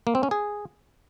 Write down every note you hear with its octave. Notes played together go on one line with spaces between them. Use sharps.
A#3
C4
C#4
G#4